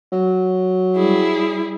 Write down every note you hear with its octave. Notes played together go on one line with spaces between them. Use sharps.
F#3
G3 E4 G#4